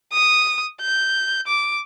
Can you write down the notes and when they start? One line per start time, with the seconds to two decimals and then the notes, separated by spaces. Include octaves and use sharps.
0.13 D#6
0.81 G6
1.47 D6